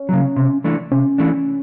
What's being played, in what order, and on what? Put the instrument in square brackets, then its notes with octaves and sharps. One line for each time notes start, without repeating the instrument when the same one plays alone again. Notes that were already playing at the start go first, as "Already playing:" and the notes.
Already playing: [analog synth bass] C#4
[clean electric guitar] C#3 F#3
C3
E3 A3 D4
[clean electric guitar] C3 [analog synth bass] C#4
[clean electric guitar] E3 A3 D4